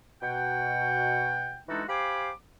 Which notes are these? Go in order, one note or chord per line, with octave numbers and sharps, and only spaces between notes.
B2 F#5 G5
E3 G#3 D4 D#4 F#4 A4
G4 C5 F5 G#5 B5 D6